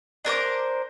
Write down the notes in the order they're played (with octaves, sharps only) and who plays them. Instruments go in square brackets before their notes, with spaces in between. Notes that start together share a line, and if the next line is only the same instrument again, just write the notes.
[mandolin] D4 A#4 C5 D6